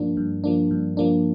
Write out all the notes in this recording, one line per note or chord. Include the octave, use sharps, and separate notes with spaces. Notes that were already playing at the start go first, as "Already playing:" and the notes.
Already playing: G2 F3 A#3 D4
G2
F3 A#3 D4
G2
F3 A#3 D4